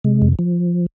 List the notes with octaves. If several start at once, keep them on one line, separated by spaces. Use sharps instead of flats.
C3 G#3
F2
F3